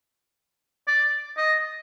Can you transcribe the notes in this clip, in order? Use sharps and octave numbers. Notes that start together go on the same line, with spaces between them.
D5
D#5